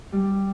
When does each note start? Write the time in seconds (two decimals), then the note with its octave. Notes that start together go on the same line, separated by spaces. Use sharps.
0.12 G3